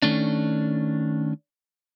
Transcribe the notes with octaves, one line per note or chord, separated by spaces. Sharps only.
D#3 A3 C#4 D4